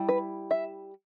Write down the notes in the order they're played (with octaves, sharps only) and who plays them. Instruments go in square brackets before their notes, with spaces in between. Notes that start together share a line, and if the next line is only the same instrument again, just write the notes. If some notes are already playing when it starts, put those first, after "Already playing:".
Already playing: [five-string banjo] G3 E4
B4
E5